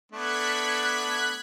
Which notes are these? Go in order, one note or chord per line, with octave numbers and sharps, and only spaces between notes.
A3 B3 D4 F#6 G#6 B6